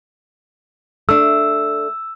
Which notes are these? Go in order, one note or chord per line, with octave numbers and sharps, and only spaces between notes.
A3 D4 E6